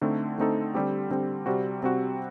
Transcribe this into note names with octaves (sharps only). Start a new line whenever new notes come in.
D3 A3 C4 D#4 A4
D3 A3 C4 D#4 A4
D3 G3 C4 G4
D3 G3 C4 G4
C3 G3 C4 F#4
C3 G3 C4 F#4